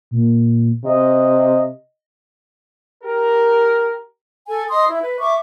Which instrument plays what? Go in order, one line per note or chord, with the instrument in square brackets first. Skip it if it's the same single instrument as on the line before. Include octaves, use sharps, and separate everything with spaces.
[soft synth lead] A#2
[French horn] C3 [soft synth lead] D#5
[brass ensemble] G4 A#4
[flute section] A4 G#5
D#5 C6 D#6
E4
B4
E5 C#6 D6